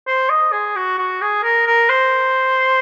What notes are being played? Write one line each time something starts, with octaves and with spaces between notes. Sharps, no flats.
C5
D#5
G#4
F#4
F#4
G#4
A#4
A#4
C5